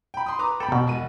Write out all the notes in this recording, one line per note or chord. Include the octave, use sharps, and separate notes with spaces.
G5 B5
C6 D#6
B4 A#5 D6
A4 G5 A#5 B5
B2
E1 F#4 D#7